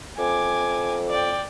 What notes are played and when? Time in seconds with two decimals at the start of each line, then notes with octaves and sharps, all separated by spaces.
0.19 F2 G#5 D6
1.10 D5 G5